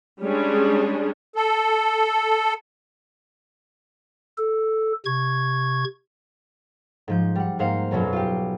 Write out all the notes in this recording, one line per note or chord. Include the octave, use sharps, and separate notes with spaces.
G3 G#3 C#4 D4 G#4
A4
A4
C3 C#6 G#6
G#2 F3 G6
G3 F#5
G#2 A#3 C5 F5 F#5 C#7
B1 F#2 B2 F#3 B4
F4 G4